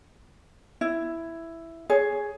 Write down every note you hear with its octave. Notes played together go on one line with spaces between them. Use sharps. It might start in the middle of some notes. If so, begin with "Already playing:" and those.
E4
G#4 C#5